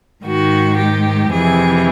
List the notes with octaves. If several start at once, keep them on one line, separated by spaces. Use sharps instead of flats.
G#2 D#3 F#4
G4
F2 C3 E3 G#4